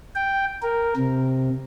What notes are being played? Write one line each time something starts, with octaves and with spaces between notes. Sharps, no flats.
G5
A#4
C3